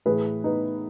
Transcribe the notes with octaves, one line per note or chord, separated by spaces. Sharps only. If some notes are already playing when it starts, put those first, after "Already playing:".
A2 E3 G#4 B4
B3 D#4